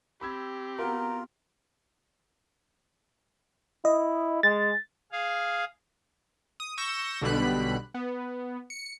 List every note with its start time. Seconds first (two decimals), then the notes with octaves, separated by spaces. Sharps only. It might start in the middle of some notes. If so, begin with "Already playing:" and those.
0.21 C4 G4 B5 E6 G#6
0.79 B3 F4 F#4 A#4 A#5
3.85 E4 D#5
4.43 G#3 A6
5.12 G#4 F5
6.60 D#6
6.77 C#6 E6 G6 A#6 E7
7.21 B1 B2 D3 G3 B5 F#6
7.94 B3
8.70 C#7